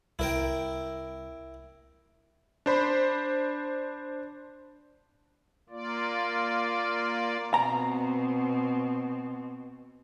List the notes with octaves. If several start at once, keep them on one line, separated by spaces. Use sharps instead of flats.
C2 E4 A#4 G5
D4 C5 B5
A#3 F4 D5
B2 C4 A#5